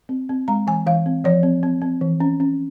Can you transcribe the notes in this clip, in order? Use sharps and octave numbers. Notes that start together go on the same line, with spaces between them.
C4
C4
G#3 A#5
E3 G#5
E3 F5
C4
F3 C#5
C4
C4
C4
E3
C#4
C#4